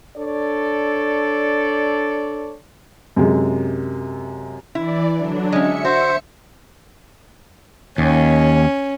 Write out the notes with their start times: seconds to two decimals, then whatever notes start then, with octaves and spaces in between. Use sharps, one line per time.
0.17 D4 A4 C#5 D5
3.16 F#2 C3 G#3
4.75 E3 E4 D5
5.17 D3 F#3 D4
5.52 G#3 C#4 E5 C#7
5.85 F#4 C5
7.98 D#2 C#4